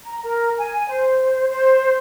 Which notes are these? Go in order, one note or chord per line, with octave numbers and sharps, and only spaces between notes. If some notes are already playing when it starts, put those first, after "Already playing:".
A#5
A#4
G#5
C5
C5